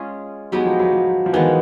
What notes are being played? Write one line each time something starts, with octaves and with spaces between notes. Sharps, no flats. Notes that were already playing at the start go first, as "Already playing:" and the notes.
Already playing: G#3 C#4 F4 G#4
F#3 G#3 B3 D#4 G4
F3
F#3
F3
F3
D#3 E3 G#3 B3